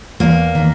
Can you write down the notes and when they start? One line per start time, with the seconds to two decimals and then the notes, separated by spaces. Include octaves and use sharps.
0.20 E2 A#3
0.55 D#3